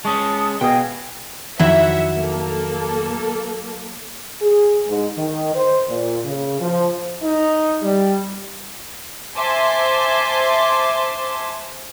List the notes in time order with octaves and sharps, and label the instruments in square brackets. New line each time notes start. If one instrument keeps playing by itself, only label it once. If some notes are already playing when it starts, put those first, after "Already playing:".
[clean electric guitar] G#3 C#4 [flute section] A5 D#6 [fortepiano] C#6
[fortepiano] B2 D#6 [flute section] G#4 D#5 F5 [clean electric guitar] G5
[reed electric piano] F2 D#3 [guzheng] F#3 E4 [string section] E5 F#5
[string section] A#3 A4
[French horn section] G#4
G#2
D#3
C5
A#2
C#3
F3
[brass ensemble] D#4
G3
[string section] C5 E5 G#5 A5 C6 D6